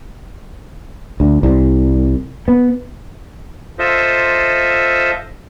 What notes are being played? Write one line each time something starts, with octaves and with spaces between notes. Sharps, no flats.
D2
C2
B3
F4 A4 C5 D#5 E5